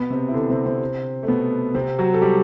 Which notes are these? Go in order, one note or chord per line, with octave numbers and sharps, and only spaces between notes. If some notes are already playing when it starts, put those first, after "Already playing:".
Already playing: B2 B3
C3 C4
E4
D3 D4
C3 C4
C3 C4
A3
B2 B3
C3 C4
F#3 F#4
A4
G3 G4